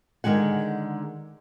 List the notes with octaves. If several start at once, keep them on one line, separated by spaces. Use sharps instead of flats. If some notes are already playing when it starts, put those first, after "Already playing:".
D3 D#3 G#3 G#4 F#5